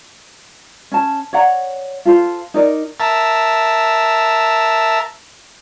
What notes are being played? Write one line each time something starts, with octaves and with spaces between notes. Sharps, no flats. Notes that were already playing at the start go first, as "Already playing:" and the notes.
C#4 A5
C#5 D5 F#5 A#5
F4 A4 C5
D#4 A#4 D5
A#4 E5 A5